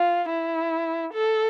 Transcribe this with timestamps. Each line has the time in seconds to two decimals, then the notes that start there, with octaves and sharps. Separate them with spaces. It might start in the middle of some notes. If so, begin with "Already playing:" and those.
Already playing: F4
0.29 E4
1.14 A4